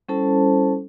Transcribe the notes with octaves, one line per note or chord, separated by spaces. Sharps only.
G3 C#4 E4 A4 C5 A5